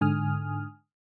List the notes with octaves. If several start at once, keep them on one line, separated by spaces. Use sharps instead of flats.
G#2 D3 G#5 D#6 F6